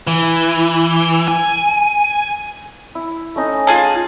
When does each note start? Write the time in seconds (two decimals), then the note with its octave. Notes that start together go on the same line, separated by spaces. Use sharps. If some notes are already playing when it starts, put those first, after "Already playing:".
0.07 E3
1.28 G#5
2.95 E4
3.36 A3 C#4 D#4
3.67 F4 G#4 A5